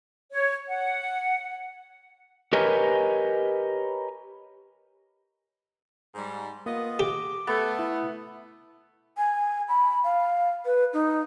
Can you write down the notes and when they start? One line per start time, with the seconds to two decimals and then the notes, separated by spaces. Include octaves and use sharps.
0.31 C#5
0.67 F#5
2.53 G4 A#4 B4 C#5 D#5 G#5
6.15 G#2 G3
6.66 A#3 B3 F4 D#5
6.99 G4 D6
7.47 A3 B3
7.79 E4
9.17 G#5
9.69 B5
10.04 F5
10.65 B4
10.93 D#4